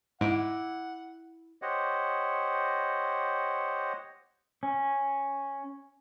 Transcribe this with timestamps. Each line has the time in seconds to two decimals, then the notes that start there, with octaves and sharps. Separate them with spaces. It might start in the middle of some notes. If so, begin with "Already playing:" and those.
0.21 G#2 E4 F#5 D6
1.62 G4 C5 C#5 D#5 F#5
4.63 C#4